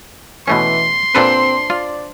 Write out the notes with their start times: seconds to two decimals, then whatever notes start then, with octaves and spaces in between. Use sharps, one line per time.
0.48 B2 E3 A3 C#4 C6
1.15 A#2 C4 D4 A4 B4 C5
1.70 F4 D5